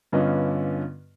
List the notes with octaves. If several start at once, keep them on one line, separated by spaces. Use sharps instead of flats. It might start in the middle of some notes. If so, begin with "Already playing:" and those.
G2 D3 B3 C#4 F4 D#5